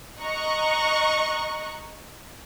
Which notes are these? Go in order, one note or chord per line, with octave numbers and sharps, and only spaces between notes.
D#5 A#5 C#6 F#6